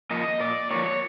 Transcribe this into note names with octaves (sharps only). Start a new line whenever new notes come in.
F3 A#3 D#5
A#2 D5
F3 A#3 C#5